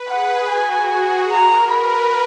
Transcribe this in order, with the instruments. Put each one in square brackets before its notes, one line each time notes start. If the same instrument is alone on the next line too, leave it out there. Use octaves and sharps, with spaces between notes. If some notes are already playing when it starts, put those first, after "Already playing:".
Already playing: [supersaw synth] B4
[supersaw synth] G#4 [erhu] F#5
[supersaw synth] F#4 [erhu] G#5
[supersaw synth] G#4
[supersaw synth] A#4 [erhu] A#5
[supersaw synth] B4 [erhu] B5